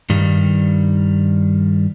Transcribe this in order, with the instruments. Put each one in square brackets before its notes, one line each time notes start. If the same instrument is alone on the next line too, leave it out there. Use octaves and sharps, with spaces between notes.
[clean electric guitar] G2 D#3 G3